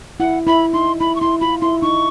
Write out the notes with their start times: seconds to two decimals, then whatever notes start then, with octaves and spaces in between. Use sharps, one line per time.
0.20 E4 F#5
0.47 E4 B5
0.73 D#4 C6
1.00 E4 B5
1.16 C#6
1.21 E4 C6
1.41 F4 B5
1.62 E4 C6
1.82 D#4 C#6